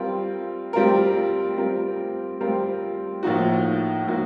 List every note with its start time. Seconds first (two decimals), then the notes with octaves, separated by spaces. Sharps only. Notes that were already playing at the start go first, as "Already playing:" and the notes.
Already playing: G3 C4 F4 A#4
0.73 G3 C4 F4 A#4
1.57 G3 C4 F4 A#4
2.41 G3 C4 F4 A#4
3.23 A2 F3 A#3 D#4 F#4
4.07 A2 F3 A#3 D#4 F#4